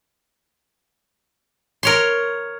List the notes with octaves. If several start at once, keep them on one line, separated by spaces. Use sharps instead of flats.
A#4 C#5 C6